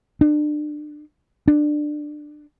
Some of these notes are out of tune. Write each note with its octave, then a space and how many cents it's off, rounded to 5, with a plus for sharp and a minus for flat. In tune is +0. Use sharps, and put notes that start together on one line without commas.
D4 +30
D4 +20